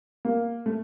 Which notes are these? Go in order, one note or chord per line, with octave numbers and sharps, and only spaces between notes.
A#3
A3